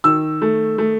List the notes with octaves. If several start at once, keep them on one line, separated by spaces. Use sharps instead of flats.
D#3 E6
A3
A3